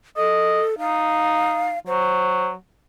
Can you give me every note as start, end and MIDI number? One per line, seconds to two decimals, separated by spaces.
0.17 0.78 69
0.17 0.63 75
0.79 1.76 63
0.79 1.79 77
1.87 2.53 54
1.87 2.47 72